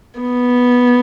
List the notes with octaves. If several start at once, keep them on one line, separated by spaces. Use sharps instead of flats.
B3